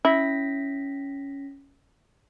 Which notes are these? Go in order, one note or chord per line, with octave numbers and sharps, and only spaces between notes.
C#4 E4 A#6 B6